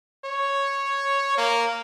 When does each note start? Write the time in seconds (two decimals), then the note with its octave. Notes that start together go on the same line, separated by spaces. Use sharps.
0.25 C#5
1.38 A#3